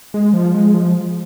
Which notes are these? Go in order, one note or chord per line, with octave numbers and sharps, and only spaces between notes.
G#3
F3
G#3
F3